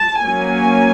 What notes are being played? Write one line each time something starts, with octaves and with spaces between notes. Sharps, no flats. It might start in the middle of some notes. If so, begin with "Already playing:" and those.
Already playing: A5
F#3 A#3 C#4 G#5